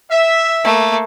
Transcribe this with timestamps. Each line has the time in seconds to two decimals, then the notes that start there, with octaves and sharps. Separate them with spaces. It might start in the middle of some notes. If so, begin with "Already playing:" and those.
0.10 E5
0.64 A3 A#3